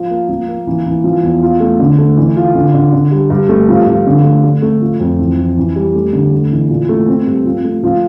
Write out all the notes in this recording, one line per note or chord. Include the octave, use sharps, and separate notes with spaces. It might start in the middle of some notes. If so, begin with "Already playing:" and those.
Already playing: F3
A#3
F3
A#3
E3
E3
F3
E2
F4
A3
D3
A3
E3
F4
D3
D3
D3
G3
G2
A3
F3
F3
D3
A3
A3
A3
F3
F2
E3
E3
E3
G3
A3
D3
A3
E3
A#2
A3
C4
G2
F3
A3
F3